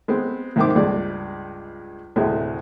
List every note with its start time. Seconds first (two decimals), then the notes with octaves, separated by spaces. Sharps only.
0.08 G#3 B3 C4
0.56 C2 G#2 D#3 C4 D6
0.75 C#2 G2 G#3 D5
2.16 D2 A2 C3 G#3